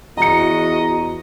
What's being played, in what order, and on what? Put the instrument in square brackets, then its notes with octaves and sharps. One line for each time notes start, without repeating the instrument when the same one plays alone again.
[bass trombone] E2 [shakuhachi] F#4 [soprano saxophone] D#5 [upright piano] A#5 C#7